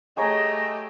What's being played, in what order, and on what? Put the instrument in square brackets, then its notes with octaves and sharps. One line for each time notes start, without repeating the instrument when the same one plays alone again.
[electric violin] A3 G4 [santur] G#4 C#5 A#5 [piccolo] D#5